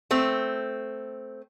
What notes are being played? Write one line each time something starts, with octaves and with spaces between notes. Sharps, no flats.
A3 C4